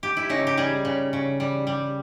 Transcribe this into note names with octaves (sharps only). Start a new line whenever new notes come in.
G4
E4
C#3 D#4
G4
G3 G#4
C#3
C#3
G3
G3